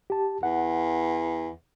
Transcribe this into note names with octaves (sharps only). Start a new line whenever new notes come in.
G4 A5
E2 F#5